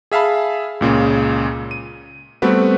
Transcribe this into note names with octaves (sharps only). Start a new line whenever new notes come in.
G#4 E5 F5 A5 B5
C#2 A#2 C#3
D#7
G3 A3 B3 C4 F#4 B4